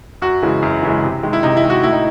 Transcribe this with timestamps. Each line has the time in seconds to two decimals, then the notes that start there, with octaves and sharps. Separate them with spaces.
0.22 F#2 F#4
0.42 C#3 E3 G#3
0.62 F#2
0.83 C#3 E3 G#3
1.04 C3
1.23 D#3 G#3
1.33 E4
1.43 C3 D#4
1.57 E4
1.63 D#3 G#3
1.70 F#4
1.83 A2 E4
1.93 D#4